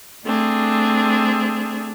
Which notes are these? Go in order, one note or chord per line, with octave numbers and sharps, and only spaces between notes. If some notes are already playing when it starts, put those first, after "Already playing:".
A3 C4 D4 G#4